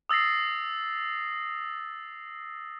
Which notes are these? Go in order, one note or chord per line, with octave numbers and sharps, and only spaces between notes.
D#6 E6 A6 A#6 C7